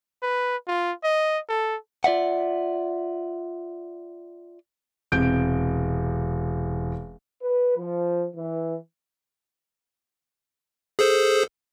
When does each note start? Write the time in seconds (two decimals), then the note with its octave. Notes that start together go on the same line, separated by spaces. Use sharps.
0.23 B4
0.67 F4
1.04 D#5
1.49 A4
2.04 F4 D5 E5 F#5
5.12 E1 C3 G6 D7
7.43 B4
7.78 F3
8.36 E3
10.99 G#4 A4 C5